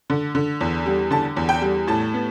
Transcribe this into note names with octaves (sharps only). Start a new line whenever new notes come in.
D3
D3
E2
G3
D3 A5
E2
G5
G3
A2 A5
B3